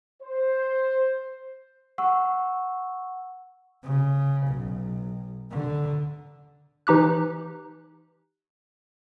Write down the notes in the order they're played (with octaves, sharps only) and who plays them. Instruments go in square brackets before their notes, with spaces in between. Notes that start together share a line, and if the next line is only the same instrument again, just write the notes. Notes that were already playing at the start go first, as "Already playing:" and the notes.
[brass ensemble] C5
[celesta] F#5 C#6 E6
[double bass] C#3
B1
D3
[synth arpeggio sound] E3 D#4 G4 F#6